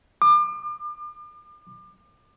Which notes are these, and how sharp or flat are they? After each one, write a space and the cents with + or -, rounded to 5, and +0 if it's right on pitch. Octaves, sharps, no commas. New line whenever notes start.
D6 +35